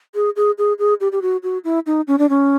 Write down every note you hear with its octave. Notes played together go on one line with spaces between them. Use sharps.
G#4
G#4
G#4
G#4
G4
G4
F#4
F#4
E4
D#4
C#4
D4
C#4